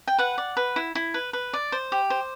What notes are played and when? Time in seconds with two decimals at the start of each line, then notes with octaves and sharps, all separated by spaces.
0.07 G5
0.18 B4 F#5
0.38 D5
0.57 B4
0.76 E4
0.95 E4
1.14 B4
1.33 B4
1.53 D5
1.72 C5
1.92 G4
2.10 C5